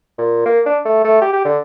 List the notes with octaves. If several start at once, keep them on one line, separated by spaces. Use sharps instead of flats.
A#2
A#3
D4
A3
A3
G4
G4
D3